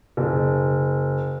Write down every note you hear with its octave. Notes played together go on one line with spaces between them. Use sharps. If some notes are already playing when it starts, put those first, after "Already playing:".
F#1